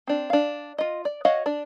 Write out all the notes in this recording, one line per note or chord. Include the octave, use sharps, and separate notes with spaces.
C4 D4
D4 F5
F4 D#5
D5
F#4 C#5 D#5 F5 F#5
D4 D5